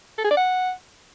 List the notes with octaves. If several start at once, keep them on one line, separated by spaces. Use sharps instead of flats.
A4
G#4
D5
F#5